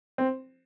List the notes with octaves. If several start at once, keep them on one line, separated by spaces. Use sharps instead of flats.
C4